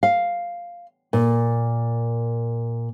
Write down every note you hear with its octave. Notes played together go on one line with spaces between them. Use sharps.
F5
A#2